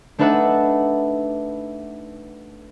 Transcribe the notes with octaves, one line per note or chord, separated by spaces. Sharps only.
A3 D4 D#4 B4 E5 F#5